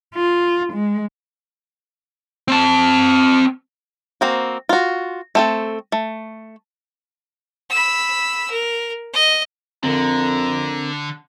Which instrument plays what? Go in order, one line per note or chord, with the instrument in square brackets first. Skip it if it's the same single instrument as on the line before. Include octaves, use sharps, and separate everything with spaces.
[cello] F4
G#3
[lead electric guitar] C4 A5
[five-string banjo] A#3 C4 F#4
F4 F#4
A3 C4 A4
A3
[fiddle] B5 E6
A#4
D#5
[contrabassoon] F2 [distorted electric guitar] D3 [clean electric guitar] C4 A#4 [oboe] A#5